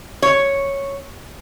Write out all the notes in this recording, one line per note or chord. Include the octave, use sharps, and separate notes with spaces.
C#5